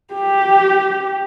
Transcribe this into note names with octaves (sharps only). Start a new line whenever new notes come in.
G4